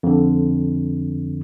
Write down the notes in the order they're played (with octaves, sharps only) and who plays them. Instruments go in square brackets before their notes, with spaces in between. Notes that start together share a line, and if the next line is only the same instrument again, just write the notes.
[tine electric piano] F2 D3